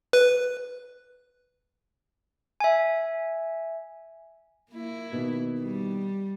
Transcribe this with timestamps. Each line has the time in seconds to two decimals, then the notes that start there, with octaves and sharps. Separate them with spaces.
0.13 B4
2.60 E5 G#5
4.71 A#3 E4
5.12 B2 D#3
5.61 G3